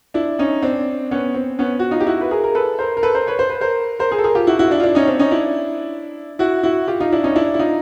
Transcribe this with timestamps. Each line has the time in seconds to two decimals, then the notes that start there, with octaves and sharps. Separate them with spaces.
0.14 D4 E4
0.39 C#4 D#4
0.63 C4 D4
1.11 B3 C#4
1.35 C4
1.59 B3 C#4
1.79 F#4
1.91 D#4 F4
2.00 G4
2.07 E4 F#4
2.21 B4
2.31 G#4 A#4
2.44 A#4
2.55 A4 B4
2.79 A#4 C5
2.97 A#4
3.03 A4 B4
3.15 A#4 C5
3.27 B4 C#5
3.39 C5
3.50 B4
3.61 A#4 C5
3.99 A#4 C5
4.11 G#4 A#4
4.18 A4
4.24 G#4 A#4
4.35 F4 G4
4.47 E4 F#4
4.59 E4 F#4
4.67 F4
4.71 D4 E4
4.80 F4
4.83 D4 E4
4.95 C#4 D#4
5.07 C4 D4
5.19 C#4 D#4
5.31 D4 E4
6.39 E4 F#4
6.63 E4 F#4
6.88 F4 G4
7.00 D#4 F4
7.12 D4 E4
7.24 C#4 D#4
7.36 D4 E4
7.54 E4
7.59 D#4 F4